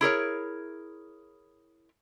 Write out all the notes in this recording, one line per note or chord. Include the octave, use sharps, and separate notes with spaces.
E4 G#4 A#4 C#5